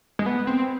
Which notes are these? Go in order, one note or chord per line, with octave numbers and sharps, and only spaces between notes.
G#3
B3
C4